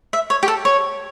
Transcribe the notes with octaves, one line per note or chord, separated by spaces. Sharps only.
E5
C#5
G4
A4
C#5